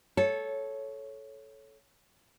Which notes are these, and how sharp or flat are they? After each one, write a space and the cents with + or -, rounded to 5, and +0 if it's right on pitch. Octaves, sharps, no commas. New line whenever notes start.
A4 -15 C#5 +0